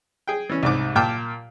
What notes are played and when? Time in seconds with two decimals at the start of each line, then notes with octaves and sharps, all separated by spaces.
0.28 G#4 G5
0.49 E3 C#4
0.63 C2 G#2 D6
0.96 A#2 G5 A5 D6 F6